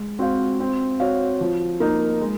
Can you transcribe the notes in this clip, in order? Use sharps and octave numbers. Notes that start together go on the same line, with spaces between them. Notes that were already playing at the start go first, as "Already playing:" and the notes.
Already playing: G#3
C4 F#4 C5 F5
C4
F#4 C#5 F5
F3
A#3 D#4
G#3